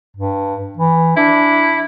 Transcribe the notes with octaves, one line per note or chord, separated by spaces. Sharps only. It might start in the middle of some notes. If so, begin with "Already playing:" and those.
G2
E3
D4 E4